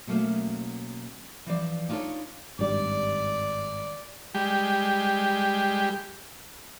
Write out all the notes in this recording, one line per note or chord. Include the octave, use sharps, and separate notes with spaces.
B2 F#3 A3 A#3 C#4
E3 F3 D5
D4 D#4 F4 F#4 A4 C#5
G#1 G2 G3 D5
G3 G#3 G4